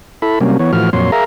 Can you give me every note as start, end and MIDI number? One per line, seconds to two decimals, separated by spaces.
0.22 0.39 64
0.22 0.39 69
0.22 0.39 83
0.40 0.57 48
0.40 0.57 54
0.40 0.57 55
0.40 0.57 58
0.40 0.57 61
0.59 0.72 52
0.59 0.72 59
0.59 0.72 73
0.73 0.90 45
0.73 0.90 52
0.73 0.90 53
0.73 0.90 66
0.73 0.90 89
0.93 1.11 41
0.93 1.11 46
0.93 1.11 54
0.93 1.11 73
0.93 1.11 84
1.12 1.24 68
1.12 1.24 70
1.12 1.24 76
1.12 1.24 77
1.12 1.24 82